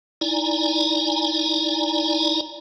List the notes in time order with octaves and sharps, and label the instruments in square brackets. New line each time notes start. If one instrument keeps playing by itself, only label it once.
[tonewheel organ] D#4 E4 D5 G#5 A#5